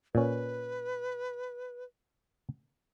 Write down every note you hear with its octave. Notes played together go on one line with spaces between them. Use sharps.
A#2 C#4 B4